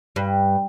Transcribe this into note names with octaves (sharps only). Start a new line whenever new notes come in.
G2